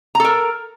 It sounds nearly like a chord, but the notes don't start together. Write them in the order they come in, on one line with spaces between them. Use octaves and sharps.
A#5 A4 A#4